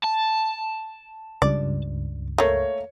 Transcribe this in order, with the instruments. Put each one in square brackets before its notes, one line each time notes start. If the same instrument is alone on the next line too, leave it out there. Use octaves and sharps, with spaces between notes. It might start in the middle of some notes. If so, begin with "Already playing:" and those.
[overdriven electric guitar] A5
[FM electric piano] C#2 G2 [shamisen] D5
[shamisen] A3 A#3 [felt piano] C#5